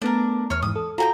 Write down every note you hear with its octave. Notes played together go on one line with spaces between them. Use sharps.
A3 B3 D4 A#4
E2 C#5 F6
G#2 E3 D#6
A4
F4 F#4 A4 G5 G#5 A#5